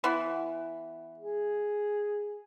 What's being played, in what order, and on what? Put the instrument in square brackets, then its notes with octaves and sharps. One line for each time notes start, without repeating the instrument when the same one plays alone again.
[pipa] E3 B3 B5
[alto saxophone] G#4